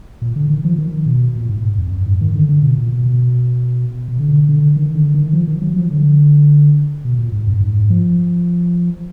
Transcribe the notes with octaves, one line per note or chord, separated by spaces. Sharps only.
A#2
D3
D#3
F3
D#3
B2
A#2
G#2
F2
F#2
G#2
D#3
D3
D3
B2
A#2
B2
B2
B2
D3
D3
D#3
D3
D#3
F3
D#3
F#3
F3
D3
B2
A#2
G#2
F#2
G#2
F3